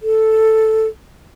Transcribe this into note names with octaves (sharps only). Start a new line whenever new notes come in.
A4